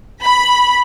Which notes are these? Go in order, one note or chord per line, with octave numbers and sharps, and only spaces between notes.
B5